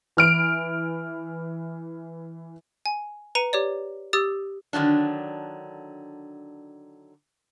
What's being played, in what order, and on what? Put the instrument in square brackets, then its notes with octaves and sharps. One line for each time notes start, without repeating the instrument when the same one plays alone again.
[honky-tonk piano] E3 F6 D7
[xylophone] G#5
B4 A#5 C#7 D#7
G4 C#5 D5
G4 D#6 E6 A6
[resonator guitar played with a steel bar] D3 D#3 F#3 D4